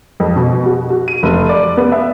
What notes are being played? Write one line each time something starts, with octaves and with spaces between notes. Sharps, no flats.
F2
B2
F#4
F#4
D#7
F1
D5
B3
E5